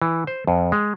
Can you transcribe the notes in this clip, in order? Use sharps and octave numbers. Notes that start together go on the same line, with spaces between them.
E3
C5
F2
G#3